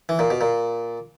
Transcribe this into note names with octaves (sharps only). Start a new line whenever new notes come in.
E3
A#2
B2
A#2